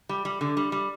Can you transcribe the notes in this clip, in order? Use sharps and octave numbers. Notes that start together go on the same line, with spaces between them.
G3
G3
D3
G3
G3